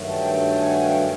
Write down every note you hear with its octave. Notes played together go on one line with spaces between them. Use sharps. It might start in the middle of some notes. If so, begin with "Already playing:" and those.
Already playing: G2 D#3 F#3 A3
G5 A5
G5 A5
F#5 G#5
F5 G5